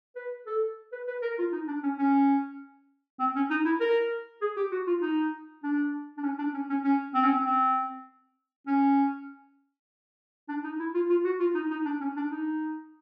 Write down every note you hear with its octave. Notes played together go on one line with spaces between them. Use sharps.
B4
A4
B4
B4
A#4
F4
D#4
D4
C#4
C#4
C4
C#4
D#4
E4
A#4
G#4
G4
F#4
F4
D#4
D4
D4
C#4
D4
C#4
C#4
C#4
C4
C#4
C4
C4
C#4
D4
D#4
E4
F4
F4
F#4
F4
D#4
D#4
D4
C#4
D4
D#4